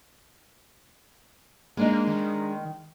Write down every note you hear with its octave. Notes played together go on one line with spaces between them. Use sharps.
G#3 A#3 D4 D#4
D#3